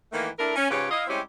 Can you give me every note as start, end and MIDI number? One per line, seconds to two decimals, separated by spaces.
0.13 0.28 51
0.13 0.28 52
0.13 0.28 57
0.13 0.28 58
0.38 0.55 57
0.38 0.55 62
0.38 0.55 64
0.38 0.55 70
0.56 0.70 61
0.70 0.89 44
0.70 0.89 49
0.70 0.89 65
0.70 0.89 67
0.70 0.89 71
0.70 0.89 73
0.90 1.05 64
0.90 1.05 75
0.90 1.05 77
1.07 1.20 55
1.07 1.20 56
1.07 1.20 60
1.07 1.20 61
1.07 1.20 64
1.07 1.20 67